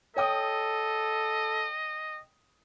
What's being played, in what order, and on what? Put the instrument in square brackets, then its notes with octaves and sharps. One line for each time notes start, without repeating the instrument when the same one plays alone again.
[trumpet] A4 [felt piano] C#5 G5 D#6 [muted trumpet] D#5